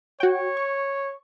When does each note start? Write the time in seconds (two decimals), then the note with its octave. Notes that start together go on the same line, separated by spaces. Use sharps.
0.20 F#4 C#5 G5
0.57 C#6